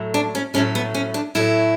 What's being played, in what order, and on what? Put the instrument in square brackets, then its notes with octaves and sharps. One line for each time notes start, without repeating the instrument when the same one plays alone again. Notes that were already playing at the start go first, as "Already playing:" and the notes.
Already playing: [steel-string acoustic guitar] A2 F#3 A3
D4
C#4
A2 F#3 A3 C#4
B3
C#4
D4
A2 F#3 A3 E4